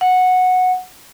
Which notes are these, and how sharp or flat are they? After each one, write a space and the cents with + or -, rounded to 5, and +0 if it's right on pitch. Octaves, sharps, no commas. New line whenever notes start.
F#5 -10